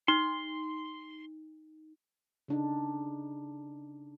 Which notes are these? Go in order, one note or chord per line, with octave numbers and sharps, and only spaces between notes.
D#4 C6
C#3 D4 D#4